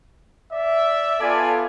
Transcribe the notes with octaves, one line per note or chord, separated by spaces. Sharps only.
D5 E5
B3 F4 A4 D5 G#5